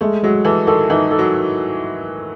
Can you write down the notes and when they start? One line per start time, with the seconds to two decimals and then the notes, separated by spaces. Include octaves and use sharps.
0.01 G#3 A3
0.23 F#3 G#3
0.45 E3 A4
0.67 D#3 A4
0.90 E3 D#4
1.11 A4
1.18 F#3